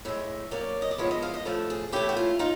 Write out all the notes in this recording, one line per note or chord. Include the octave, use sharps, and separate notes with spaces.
A2 E3 G#3 E5
F#3 A#3 C#4 D5
D#5
D5
D3 F3 G#3 B3 E4 C#5
D#5
F5
D#5
A2 F3 A3 A4
G#4
E3 A3 C#4 E4 G4
F#4
F4
D#4 F4